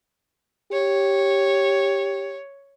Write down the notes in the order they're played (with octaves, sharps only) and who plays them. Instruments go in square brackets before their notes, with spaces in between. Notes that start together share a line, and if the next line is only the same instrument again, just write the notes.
[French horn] G4 [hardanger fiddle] C#5